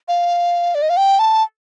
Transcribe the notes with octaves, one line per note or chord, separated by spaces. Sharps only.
F5
D5
D#5
F5
G5
A5